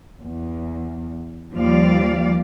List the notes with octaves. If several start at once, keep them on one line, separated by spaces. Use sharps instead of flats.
E2
D#2 F3 G3 A#3 D5 F5